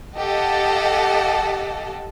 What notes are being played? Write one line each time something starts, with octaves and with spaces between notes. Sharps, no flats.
G4 A4 D#5 F5 F#5 A5